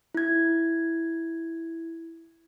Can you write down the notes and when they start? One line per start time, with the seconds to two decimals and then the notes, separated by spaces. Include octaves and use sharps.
0.14 E4 G#6